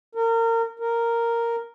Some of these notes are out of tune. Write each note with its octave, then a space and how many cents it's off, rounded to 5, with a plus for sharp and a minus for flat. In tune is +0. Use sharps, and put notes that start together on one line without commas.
A#4 -30
A#4 -5